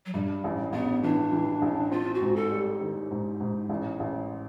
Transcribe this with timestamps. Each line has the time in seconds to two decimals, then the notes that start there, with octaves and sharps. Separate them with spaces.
0.06 F#3
0.13 G2 G3
0.44 A1
0.73 A1 B3
1.03 E3 D4
1.32 E3
1.62 A1
1.91 C4 F4
2.14 F#4
2.21 G#2
2.36 A4
2.51 G3
2.81 D#3
3.11 G#2
3.40 G#2
3.69 A1
4.00 A1